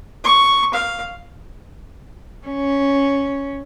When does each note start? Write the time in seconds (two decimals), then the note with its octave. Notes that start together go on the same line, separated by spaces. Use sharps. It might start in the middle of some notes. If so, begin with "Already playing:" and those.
0.24 C#6
0.73 F5
2.47 C#4